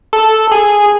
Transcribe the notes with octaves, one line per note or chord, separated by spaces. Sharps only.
A4
G#4